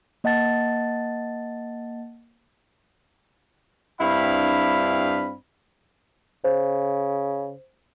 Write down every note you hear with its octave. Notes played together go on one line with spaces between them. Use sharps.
A#3 D#5 F#5 A5 A6
G2 C4 D4 E4 F5 B5
C#3 C5